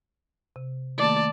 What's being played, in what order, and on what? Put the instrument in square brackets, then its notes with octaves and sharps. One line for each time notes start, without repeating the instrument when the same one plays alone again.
[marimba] C3
[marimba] D#3 A3 A#3 [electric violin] D5 A5